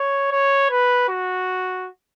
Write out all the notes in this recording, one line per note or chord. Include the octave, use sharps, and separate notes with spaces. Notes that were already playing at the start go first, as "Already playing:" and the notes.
Already playing: C#5
C#5
B4
F#4